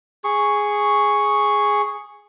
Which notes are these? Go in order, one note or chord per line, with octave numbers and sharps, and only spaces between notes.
G#4 C#6